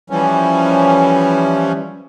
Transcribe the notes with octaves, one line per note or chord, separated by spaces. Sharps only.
E3 F3 G3 C#4